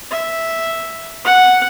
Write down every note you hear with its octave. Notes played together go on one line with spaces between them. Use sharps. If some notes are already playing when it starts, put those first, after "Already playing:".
E5
F#5